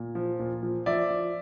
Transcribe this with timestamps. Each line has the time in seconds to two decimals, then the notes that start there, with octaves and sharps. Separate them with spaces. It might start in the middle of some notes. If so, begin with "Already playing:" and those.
Already playing: A#2
0.15 F3
0.39 A#2
0.63 F3
0.86 F3 D5 E5
1.10 F3